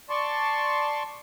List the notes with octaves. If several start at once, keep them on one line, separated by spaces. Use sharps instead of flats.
D5 A5 C6 C#6